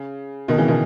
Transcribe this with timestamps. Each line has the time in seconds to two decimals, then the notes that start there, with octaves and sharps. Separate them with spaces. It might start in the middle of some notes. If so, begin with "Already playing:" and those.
Already playing: C#3
0.48 B2 D#3
0.58 C#3 E3
0.68 B2 D#3